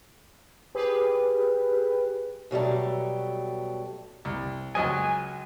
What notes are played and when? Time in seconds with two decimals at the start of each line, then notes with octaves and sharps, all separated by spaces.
0.75 G4 G#4 B4
2.51 B2 F#3 G3 A3
4.25 C2
4.75 C#2 F#3 D#5 G#5